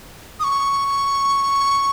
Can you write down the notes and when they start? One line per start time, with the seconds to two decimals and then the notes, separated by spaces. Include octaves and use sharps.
0.39 D#6
0.43 C#6